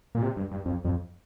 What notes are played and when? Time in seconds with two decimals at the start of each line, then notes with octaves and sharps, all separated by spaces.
0.15 A#2
0.22 C3
0.36 G2
0.51 G2
0.66 F2
0.85 F2